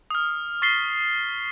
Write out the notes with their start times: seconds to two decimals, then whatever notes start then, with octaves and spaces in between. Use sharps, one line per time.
0.10 D#6 F6
0.62 C#6 A6 B6 C7 G7